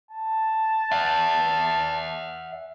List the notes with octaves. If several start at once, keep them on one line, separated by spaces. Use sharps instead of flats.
A5
E5 F#5